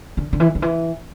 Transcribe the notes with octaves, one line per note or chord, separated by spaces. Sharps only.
D3
D3
E3
D3
E3